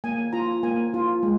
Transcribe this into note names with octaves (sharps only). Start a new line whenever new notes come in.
A#3 G#5
F4 A#5
A#3 G#5
F4
G#3